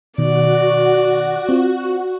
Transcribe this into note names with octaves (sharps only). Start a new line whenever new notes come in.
B2 D#3 F#4 D5
C4 F4